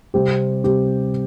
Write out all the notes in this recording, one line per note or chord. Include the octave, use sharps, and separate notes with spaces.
C3 G3 C4 G4
C3 G3 C4 G4